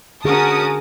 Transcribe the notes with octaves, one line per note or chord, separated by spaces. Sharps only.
D3 C#4 F#4 G#4 A#4 A5 D#6